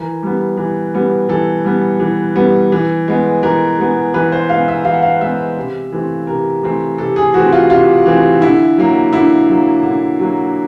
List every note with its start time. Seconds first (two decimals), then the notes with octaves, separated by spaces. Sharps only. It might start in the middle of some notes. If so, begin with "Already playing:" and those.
Already playing: E3 A#4
0.23 G3 B3
0.57 E3
0.94 G3 B3
1.29 E3 A4
1.65 G3 B3
2.00 E3
2.36 G3 B3
2.72 E3
3.08 G#3 B3
3.43 E3 A#4
3.78 G#3 B3
4.14 E3 B4
4.32 C5
4.49 G#3 B3 F5
4.68 E5
4.85 E3 F5
4.94 F#5
5.02 F5
5.21 G#3 B3 E5
5.57 C3
5.92 E3 A3 C4
6.27 C3 A#4
6.63 E3 A3 C4
6.98 C3 A4
7.16 G#4
7.34 E3 A3 C4 F#4
7.52 F4
7.70 C3 F4
8.06 E3 A3 C4
8.41 D3 E4
8.78 F#3 A#3
9.13 D3 E4
9.48 F#3 A#3
9.83 D3
10.20 F#3 A#3